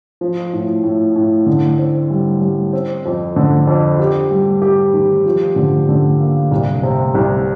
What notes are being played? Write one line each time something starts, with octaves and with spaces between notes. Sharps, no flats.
F3
A2
A2
A2
D3
C4
G3
G3
C4
F2
D3
F2
G4
G3
G4
D#3
F3
D3
D3
A#3
C2
C3
C2